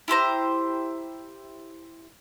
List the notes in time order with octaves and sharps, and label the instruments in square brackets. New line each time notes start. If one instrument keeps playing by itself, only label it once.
[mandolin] E4 G4 C5 A#5